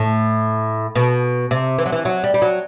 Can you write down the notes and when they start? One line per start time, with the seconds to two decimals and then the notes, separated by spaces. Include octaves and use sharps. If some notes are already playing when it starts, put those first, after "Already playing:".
Already playing: A2
0.95 B2
1.51 C3
1.78 E3
1.86 F#3
1.92 E3
2.05 F#3
2.24 G3
2.34 G3
2.42 F#3